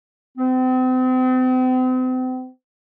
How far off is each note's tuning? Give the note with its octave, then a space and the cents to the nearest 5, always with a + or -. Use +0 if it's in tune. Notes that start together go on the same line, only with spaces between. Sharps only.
C4 -40